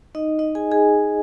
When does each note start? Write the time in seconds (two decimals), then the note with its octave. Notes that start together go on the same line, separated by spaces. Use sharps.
0.15 D#4 D#5
0.39 D#4 D#5
0.55 G#4 G#5
0.71 G#4 G#5